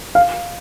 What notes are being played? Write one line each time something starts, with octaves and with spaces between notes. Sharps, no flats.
F5